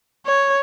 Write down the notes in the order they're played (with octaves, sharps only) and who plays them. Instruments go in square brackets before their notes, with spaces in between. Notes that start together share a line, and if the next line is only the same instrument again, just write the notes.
[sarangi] C#5